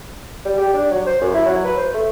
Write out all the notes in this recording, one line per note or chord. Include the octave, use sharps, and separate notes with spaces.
G3
G4
D4
F#3
C5
F#2
E4
F#3
B4
C5
A3